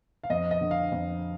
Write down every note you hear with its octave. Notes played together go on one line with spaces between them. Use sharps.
F5
F2 D#5
D#5
D3
F5
F2